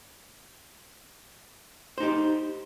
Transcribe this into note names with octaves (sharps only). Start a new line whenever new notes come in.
D#4 G4 C5